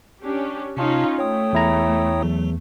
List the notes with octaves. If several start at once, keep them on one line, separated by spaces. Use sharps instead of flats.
C#4 D4 G4
C3 C#4 D#4 F4 A5
A3 C#5 G5 D#6
E2 E4 A#5
E2 F#3